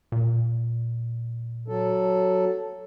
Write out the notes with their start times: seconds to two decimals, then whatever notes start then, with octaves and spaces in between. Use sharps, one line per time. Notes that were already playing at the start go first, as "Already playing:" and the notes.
0.12 A#2
1.68 F#3 A4